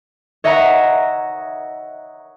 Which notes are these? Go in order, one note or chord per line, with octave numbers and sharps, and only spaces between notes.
C#5 D#5 E5 F#5 A#5